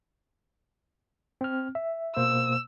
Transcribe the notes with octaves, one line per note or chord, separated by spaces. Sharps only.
C4 F6
E5
B2 A#3 C5 E6